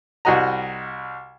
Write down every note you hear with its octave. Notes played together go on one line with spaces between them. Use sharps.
C2 G3 F#4 D#5 A#5